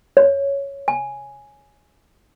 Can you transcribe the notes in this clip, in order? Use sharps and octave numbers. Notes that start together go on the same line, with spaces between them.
C#5
G#5